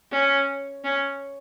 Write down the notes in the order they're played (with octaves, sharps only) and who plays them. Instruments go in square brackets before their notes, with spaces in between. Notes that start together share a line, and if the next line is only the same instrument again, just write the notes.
[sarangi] C#4
C#4